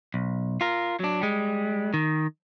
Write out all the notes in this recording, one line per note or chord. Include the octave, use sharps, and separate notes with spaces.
B1
F4 A#4
F#3 D4
G3 G#3
D#3